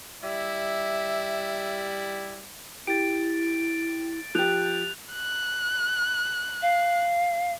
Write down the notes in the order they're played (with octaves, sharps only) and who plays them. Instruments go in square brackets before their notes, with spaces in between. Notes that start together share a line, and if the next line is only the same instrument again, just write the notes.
[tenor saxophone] G3 [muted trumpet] E4 [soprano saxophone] E5
[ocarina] E4 [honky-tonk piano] G4 [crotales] A6 D7
[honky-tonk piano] F3 G4 [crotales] F#6 G6 F7
[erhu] F#6
[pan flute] F5